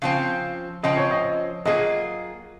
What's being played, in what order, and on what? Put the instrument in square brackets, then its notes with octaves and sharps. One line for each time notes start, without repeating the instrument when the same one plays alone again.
[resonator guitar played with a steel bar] C#3 F3 C4 [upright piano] F5
[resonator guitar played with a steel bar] C#3 F3 C4 [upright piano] D#5
[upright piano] C#5
D#5
[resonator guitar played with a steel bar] F#3 A#3 F4 G#4 [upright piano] D#5